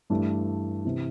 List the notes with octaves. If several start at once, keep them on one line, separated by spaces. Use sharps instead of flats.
G2 E3 A3 D4
C3 E3